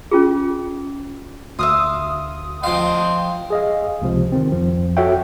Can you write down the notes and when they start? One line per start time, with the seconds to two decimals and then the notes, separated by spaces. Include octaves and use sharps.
0.11 C#4 F4 G#4
1.59 D2 E5 F5 C6 D#6
2.63 F3 D#5 F5 G5 C6
3.50 G#4 D#5 F5
4.02 C#2 C3 F3
4.32 D#3 C4
4.52 F2 F3
4.97 F#4 A4 C#5 E5 F#5 G5